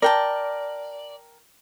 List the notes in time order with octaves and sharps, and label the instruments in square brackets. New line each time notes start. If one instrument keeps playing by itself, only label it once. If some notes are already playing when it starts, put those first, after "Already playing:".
[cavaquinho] A#4 G5 A5 [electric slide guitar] D5